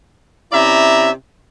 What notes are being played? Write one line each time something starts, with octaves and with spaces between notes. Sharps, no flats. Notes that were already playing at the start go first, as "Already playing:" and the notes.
C3 C#4 E4 D5 E5 A#5